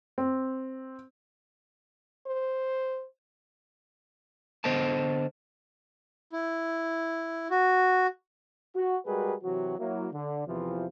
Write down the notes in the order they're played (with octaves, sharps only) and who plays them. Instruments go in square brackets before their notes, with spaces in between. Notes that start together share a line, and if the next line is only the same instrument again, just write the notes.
[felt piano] C4
[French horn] C5
[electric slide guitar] D3 B3 C5 D#5 G5 A5
[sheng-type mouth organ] E4
F#4
[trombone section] F#4
G3 G#3 F#4 G#4 A#4 B4
C3 E3 F#3 F#4
F#3 A#3 E4
D3
E2 C3 E3 F3